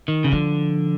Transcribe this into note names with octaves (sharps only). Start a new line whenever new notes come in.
D#3
C#3
D3 F3